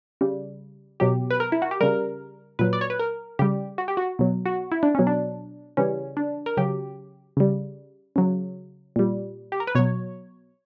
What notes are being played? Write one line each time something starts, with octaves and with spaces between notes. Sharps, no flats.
C#3 G3
B2 F#3 G4
B4
A#4
E4
F#4
G4
C#3 G3 A#4
A#2 F#3 B4
D5
C#5
B4
A#4
C#3 G3 G4
F#4
G4
F#4
B2 F#3
F#4
E4
D4
B2 F#3 C#4
D4
C#3 E3 G3 C#4
D4
A#4
C#3 F#3 G4
C#3 G3
C#3 F#3
A#2 G3
G4
A#4
B4
B2 F#3 C#5